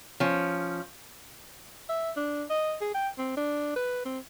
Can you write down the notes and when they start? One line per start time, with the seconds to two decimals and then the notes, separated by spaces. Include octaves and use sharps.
0.20 F3 C#4
1.89 E5
2.16 D4
2.50 D#5
2.81 G#4
2.94 G5
3.18 C4
3.37 D4
3.76 B4
4.05 C4